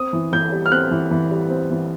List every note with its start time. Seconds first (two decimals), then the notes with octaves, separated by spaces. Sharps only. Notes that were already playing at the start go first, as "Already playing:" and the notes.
Already playing: C4 D#6
0.13 E3
0.32 E3 G6
0.52 G3
0.66 F6
0.72 C4 F#6
0.91 E3
1.11 E3
1.31 G3
1.50 C4
1.70 E3